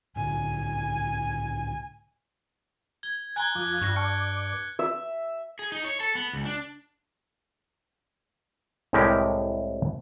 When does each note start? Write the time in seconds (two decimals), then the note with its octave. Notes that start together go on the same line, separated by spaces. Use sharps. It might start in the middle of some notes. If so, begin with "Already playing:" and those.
0.16 C2 A2 D3 G#5
3.03 G#6 G7
3.36 G#5 A#5 C6 F#6 G#6 G7
3.55 F2 F3 D6
3.81 G2 C#6 A#6
3.96 D5 A5 C#6 F6 C#7
4.79 E5
5.59 G#4
5.72 D#4
5.84 C#5
6.00 A4
6.15 B3
6.33 C#2
6.45 D4
8.93 C2 A2 G#3 G4 A#4